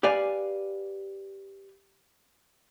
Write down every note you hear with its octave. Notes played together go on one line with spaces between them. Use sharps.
G4 B4 D5 F5 G#5